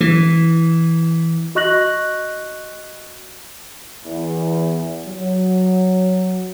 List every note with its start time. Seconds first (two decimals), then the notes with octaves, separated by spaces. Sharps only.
0.01 E3
1.55 F#4 D#5 C#6 F#6 A#6 F#7
4.05 E2
5.06 F#3